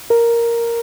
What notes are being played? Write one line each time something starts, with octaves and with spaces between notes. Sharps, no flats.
A#4